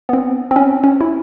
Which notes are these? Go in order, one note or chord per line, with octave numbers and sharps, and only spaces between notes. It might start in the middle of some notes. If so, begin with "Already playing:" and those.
B3
C4
C4
C#4
C#4
E4